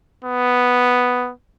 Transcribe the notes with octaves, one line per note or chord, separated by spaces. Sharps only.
B3